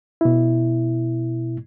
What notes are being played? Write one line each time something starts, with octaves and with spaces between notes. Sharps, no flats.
B2 E4